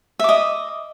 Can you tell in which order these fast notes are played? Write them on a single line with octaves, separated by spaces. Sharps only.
E5 D6 D#5